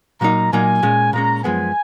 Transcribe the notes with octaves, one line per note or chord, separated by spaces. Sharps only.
A#2 F#3 A#3 D#4 A#5
A#2 F#3 A#3 D#4 G#5
A#2 G#3 C#4
A#2 G#3 C#4 A#5
F#2 F3 G#3 B3 G#5